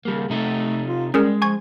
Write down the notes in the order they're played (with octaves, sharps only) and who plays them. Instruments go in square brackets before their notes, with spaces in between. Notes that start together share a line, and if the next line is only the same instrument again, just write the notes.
[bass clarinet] C#3 [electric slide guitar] G3 A#3
[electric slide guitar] C3 D#4 A4 [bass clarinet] A3
[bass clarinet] F4
[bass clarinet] G3 [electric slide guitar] G#3 [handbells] C#4 G#4 A#4
[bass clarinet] F3 [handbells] G#5 C#6 G#6